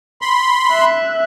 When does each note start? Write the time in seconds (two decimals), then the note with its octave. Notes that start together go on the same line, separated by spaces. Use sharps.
0.22 B5 C6
0.72 E5 F#6